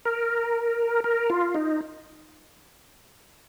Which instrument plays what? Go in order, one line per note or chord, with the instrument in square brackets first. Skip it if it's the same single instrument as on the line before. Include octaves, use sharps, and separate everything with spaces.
[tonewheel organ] A#4
A#4
F4
D#4